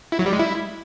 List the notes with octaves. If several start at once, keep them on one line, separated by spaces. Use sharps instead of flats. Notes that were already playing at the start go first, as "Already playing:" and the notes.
E4
F#3
G3
G#3
E4